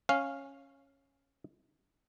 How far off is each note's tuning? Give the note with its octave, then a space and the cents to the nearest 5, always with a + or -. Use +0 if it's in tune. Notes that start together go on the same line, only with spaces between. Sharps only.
C#4 -10 F5 +0